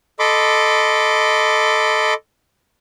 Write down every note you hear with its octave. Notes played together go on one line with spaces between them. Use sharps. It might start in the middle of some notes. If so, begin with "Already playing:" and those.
A4 D#5 B5 C6 D6